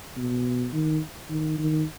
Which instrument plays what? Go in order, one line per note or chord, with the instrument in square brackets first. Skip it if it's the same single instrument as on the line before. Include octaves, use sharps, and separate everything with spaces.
[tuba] B2
D#3
D#3
D#3